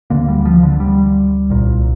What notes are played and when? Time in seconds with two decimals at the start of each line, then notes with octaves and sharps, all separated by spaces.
0.10 D2 D3 A#3
0.28 G3
0.45 F3
0.63 D3
0.80 G3
1.50 C2 A#2